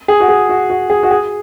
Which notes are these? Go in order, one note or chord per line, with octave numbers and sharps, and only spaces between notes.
G#4
F#4
G#4
F#4
F#4
G#4
F#4
G#4